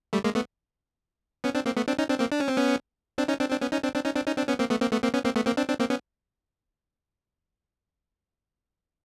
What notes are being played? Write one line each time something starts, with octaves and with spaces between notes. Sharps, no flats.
G3 A3
G#3 A#3
A3 B3
B3 C#4
C4 D4
A#3 C4
A3 B3
C4 D4
C#4 D#4
C4 D4
A#3 C4
D4
C#4
C4
B3 C#4
C4 D4
C#4 D#4
C4 D4
C4 D4
B3 C#4
C#4 D#4
C4 D4
C4 D4
C#4 D#4
C4 D4
C#4 D#4
C4 D4
B3 C#4
A#3 C4
A3 B3
A#3 C4
A3 B3
A#3 C4
B3 C#4
A#3 C4
A3 B3
A#3 C4
C4 D4
C4 D4
A#3 C4
B3 C#4